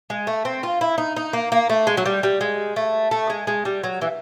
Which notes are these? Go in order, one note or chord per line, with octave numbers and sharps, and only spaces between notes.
G#3
A3
C4
F4
E4
D#4
D#4
A#3
A#3
A3
G#3
F#3
G3
G3
G#3
A3
A3
G#3
G#3
G3
F#3
E3